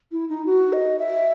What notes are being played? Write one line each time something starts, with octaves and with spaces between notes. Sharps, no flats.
E4
D#4
F#4
D#5
E5